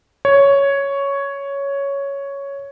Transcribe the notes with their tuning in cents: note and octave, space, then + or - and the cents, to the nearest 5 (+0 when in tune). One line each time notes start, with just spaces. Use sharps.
C#5 +5